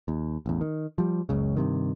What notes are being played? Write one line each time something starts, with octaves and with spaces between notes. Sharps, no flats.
D#2
A1 E2
D#3
F3 G3
F#1 C#2 C#3
G2 C3 D#3